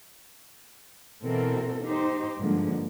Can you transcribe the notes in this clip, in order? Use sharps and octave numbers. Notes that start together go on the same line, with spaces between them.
B2 E3 C4 A4 A#4
D#4 G4 C5
G2 D3 F3 G#3 A#3